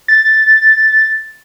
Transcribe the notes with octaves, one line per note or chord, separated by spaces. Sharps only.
A6